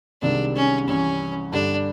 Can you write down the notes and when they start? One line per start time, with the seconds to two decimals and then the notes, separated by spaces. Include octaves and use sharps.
0.22 C2 C3 D#3 G#3 D4
0.56 C#4
0.88 C2 C3 E3 C#4
1.52 G2 D3 G3 D4